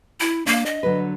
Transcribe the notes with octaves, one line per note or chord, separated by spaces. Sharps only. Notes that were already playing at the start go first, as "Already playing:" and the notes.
E4
A#3 D4
D#5
D3 F#3 B4